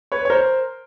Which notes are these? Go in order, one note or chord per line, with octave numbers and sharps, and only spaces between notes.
B4 C#5
C#5
A#4 C5